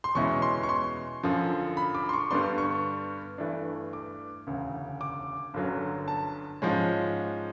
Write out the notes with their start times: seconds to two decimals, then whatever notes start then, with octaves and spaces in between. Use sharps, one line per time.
0.04 C6
0.15 E2 B2 G#3 C#4 E4 C#6
0.42 C6
0.63 C#6
0.69 C6
1.23 F#2 D3 F3
1.77 B5
1.95 D6
2.09 C6
2.13 C#6
2.31 G2 D3 G3 B3 D4 C6
2.58 C#6
3.38 G2 E3 A3 D4
3.93 D6
4.47 E1 D2 C#3
5.01 D6
5.54 G1 F#2 D3 F#3
6.08 A5
6.62 G#2 F3 G#3 C#4